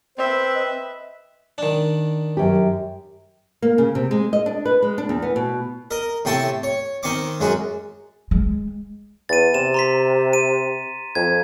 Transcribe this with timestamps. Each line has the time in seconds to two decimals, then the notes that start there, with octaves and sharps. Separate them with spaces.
0.18 C4 B4 C5 E5
0.55 D#5
1.58 D#3 D4
2.37 F#2 G4
3.62 A#3
3.78 C#3
3.95 C3
4.11 G#3
4.33 D#5
4.46 D4
4.65 B4
4.82 G#3
4.98 D4
5.09 E2
5.22 B3
5.36 B2
5.91 A#4 D#5
6.25 A2 C3 G5 A5 C#6
6.63 C#5
7.03 D#3 C4 D#5 C#6 D6
7.41 F#2 G#3 F#4
8.31 G#3
9.29 E2 A6 D#7
9.54 C3 E7
9.74 A#5 C6 B6
10.33 D#7
11.15 F2 G#6